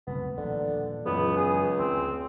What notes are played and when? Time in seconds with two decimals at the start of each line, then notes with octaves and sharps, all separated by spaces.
0.07 F#1 C2 A3 B3
0.37 D#1 D3 F3
1.06 C#2 F#2 E3 B3
1.37 G#4
1.79 D2 C4